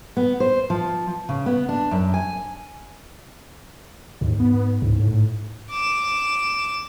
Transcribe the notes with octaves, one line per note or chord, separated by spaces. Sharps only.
B3
C5
F3
C#3
B3
D4
F#2
G#5
D#2 G#2
B3
C#2 G#2
A2
D6 E7